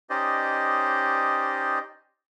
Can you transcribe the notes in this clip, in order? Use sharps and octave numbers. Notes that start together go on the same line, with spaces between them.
C#4 D#4 G4 C5 D5 D#5